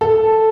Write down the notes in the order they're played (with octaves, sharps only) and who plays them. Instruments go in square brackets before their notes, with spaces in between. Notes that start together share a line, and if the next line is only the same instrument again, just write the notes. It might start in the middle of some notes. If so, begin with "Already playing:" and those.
[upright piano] A4